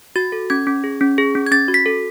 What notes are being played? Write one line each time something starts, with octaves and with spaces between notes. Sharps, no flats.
F#4 A6
A4
C#4 G#6
C#4
G#4
C#4
G#4
C#4
G#6
C#4 A6
F#4
B6
A4